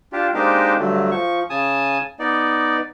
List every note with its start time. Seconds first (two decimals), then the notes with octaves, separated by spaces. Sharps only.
0.12 D4 F4 G4
0.34 G#3 A#3 C4 D4 D#4 G4
0.79 G2 D3 F#3 A3
1.11 F3 C#6
1.50 C#3 G#5 A5 D#6
2.19 B3 D#4 D5